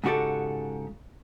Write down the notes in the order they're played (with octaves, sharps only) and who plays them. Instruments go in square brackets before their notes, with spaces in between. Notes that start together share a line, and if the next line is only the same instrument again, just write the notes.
[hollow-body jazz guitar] G#2 C#3 F#4 G4 A4